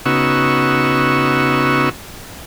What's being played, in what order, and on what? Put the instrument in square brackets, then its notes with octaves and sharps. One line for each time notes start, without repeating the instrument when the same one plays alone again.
[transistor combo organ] C#3 B3 D#4 F#4 C#6 E6